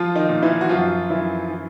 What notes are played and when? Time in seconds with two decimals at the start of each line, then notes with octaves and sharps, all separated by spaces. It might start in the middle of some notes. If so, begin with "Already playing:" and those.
Already playing: F3 F4
0.16 D#3 D#4
0.29 A#2
0.42 E3 E4
0.61 F#4
0.69 F#2 F3 F4
1.10 F#2 E3 E4
1.51 E3